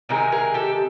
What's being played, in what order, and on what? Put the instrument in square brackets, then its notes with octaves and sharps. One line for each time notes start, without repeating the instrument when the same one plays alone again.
[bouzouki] C3 D#3 G#3 G#4 A#4
G#4 A#4
G4 A4